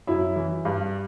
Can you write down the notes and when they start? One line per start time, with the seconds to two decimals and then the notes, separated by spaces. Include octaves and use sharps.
0.07 F#2 E4
0.36 E3
0.65 G2